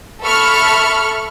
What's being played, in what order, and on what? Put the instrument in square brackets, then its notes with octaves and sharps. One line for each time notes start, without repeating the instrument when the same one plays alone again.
[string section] A4 E5 B5 C#6 F6